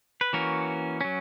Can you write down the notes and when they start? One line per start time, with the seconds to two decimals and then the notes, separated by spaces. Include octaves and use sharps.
0.21 B4
0.33 E3 A#3 C#4 F#4 A#4
1.01 F#3 C#4